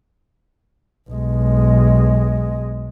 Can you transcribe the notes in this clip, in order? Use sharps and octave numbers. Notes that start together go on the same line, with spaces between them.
B1 G#3